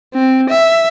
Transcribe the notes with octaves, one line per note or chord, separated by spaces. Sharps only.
C4
E5